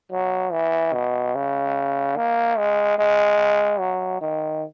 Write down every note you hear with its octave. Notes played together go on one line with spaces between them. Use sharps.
F#3
E3
B2
C#3
A#3
G#3
G#3
F#3
D#3